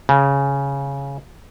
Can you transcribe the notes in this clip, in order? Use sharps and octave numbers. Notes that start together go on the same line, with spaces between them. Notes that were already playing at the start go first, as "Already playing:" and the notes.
C#3